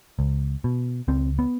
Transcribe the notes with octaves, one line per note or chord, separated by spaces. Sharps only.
C#2
B2
C#2 C4
B3